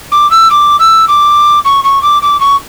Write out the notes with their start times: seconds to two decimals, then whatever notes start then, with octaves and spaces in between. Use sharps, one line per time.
0.12 D6
0.30 E6
0.50 D6
0.79 E6
1.08 D6
1.65 C#6
1.84 C#6
2.02 D6
2.22 D6
2.40 C#6